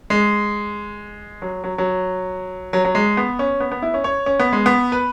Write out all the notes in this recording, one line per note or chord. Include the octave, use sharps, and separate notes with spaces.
G#3
F#3
F#3
F#3
F#3
F#3
G#3
B3
C#4
B3
B3
E4
C#4
C#5
C#4
B3
G#3
B3
B4